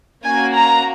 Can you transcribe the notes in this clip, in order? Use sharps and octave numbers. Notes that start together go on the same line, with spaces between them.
A#3 C#4 F#4 G#5
A#5